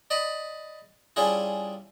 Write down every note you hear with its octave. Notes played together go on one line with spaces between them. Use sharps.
D5 D#5 B5
G3 C#4 D4 E4 F4 G#4